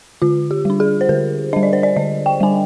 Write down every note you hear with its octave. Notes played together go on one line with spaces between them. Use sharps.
D3 F4
G4
G3 D4
G#4
C5
D3 A#4
G3 D4 D#5
D5
C5
D5
D3 D#5
G5
G3 D4 G#5